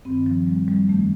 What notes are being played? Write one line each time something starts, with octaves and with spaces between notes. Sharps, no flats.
G2 D#3 C4
F3
G3
G3
F2 D#3 A3